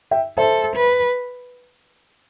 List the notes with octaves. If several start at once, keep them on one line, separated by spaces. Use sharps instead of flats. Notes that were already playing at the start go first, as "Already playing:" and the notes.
E5 G5
A4 C5 E5
B4